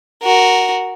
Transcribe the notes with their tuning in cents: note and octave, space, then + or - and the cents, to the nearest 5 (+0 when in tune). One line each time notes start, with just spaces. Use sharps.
F#4 +0 A#4 +0